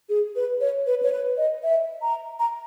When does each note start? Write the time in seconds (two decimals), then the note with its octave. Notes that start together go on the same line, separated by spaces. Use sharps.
0.09 G#4
0.36 B4
0.61 C#5
0.87 B4
1.02 C#5
1.12 B4
1.37 D#5
1.63 E5
2.02 A#5
2.39 A#5